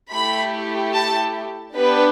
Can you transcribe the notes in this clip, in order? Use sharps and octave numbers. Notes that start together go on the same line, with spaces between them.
A3 E4 G4 B5
A5
B3 D4 G4 B4